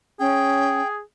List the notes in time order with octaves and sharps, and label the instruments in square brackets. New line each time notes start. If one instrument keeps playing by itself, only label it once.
[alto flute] C#4 [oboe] G#4 [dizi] G5